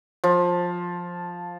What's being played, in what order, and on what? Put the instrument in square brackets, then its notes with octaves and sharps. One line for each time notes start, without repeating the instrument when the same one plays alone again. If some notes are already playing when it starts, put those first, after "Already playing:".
[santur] F3